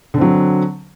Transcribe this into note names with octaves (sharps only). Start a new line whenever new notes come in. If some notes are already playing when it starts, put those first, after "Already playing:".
D3 F#3 C4